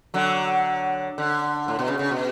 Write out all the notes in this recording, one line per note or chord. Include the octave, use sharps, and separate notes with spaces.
D3 F#3
D3
A2
B2
C#3
C#3
B2